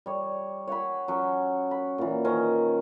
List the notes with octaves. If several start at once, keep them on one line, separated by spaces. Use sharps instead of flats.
G3 C#5
C#5 F#5 G#5 B5
F#3 C#4
B5
A#2 E3
D#3 C#4 C5 A#5